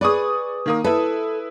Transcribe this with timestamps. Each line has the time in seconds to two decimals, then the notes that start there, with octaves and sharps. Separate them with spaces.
0.01 G#4 B4 D5 C#6 D#6
0.66 D#3 A#3 D#6
0.84 E4 A4 B4